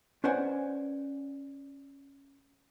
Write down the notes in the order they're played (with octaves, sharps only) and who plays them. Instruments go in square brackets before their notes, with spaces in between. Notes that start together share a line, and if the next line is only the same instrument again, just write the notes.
[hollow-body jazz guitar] C#4 B4 C5 D5 F#5 G#5